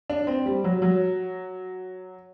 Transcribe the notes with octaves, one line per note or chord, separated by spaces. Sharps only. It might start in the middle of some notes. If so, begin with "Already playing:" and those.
D4
C4
G3
F#3
F#3